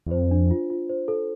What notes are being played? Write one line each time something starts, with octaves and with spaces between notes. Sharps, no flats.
E2
F2 C5
D4
F4
F4
C5
A4